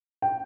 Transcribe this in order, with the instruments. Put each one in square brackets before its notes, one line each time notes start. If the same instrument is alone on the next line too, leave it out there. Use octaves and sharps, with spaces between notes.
[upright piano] G5